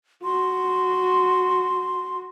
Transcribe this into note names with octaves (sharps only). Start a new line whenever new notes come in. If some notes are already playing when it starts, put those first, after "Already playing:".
F#4 C6